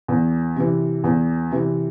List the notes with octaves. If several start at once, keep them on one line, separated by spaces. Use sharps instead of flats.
E2
C3 E3
E2
C3 E3